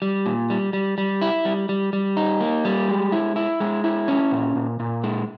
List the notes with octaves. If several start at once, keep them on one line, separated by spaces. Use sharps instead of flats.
G3
A#2
G3
G3
G3
E4
G3
G3
G3
D#4
A#3
G3
G#3
E4
E4
G#3
E4
C#4
A#2
A#2
A#2
G#3